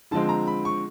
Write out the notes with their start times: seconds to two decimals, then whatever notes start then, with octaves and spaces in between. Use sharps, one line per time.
0.11 D3 F3 G#3 C4 A5
0.29 A#5
0.47 B5
0.65 C#6